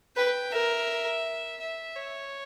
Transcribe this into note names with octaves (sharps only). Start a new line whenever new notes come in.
B4 G5
A#4 E5
E5
C#5